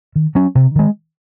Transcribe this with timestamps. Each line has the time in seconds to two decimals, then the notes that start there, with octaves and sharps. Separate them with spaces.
0.16 D#3
0.35 F#3 C#4
0.55 C3
0.75 D#3 G#3